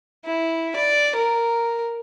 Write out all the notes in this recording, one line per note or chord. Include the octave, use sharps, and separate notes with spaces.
E4
D5
A#4